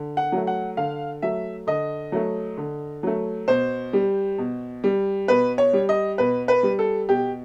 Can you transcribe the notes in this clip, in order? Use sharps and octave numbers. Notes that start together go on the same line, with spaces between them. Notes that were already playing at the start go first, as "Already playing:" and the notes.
Already playing: D3
F#5
F#3 A3
F#5
D3 F5
F#3 A3 E5
D3 D#5
F#3 A3
D3
F#3 A3
B2 C5
G3
B2
G3
B2 B4
C#5
G3
D#5
B2 B4
B4
G3
A4
B2 G4